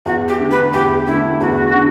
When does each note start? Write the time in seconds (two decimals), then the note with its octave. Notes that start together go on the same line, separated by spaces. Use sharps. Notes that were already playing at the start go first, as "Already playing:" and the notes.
0.06 E2 F#4
0.28 G4
0.40 D3 A3
0.51 B4
0.73 E2 G4
1.07 D3 A3 E4
1.41 E2 F#4
1.74 D3